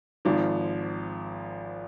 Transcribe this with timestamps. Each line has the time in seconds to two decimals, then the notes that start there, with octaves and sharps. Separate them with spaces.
0.25 G#1 G#2 F3